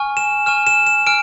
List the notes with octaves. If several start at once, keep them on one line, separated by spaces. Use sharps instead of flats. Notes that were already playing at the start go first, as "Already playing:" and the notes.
Already playing: G#5 C#6 F6
E7
G#5 C#6 F6 E7
E7
E7
G#5 F6 D7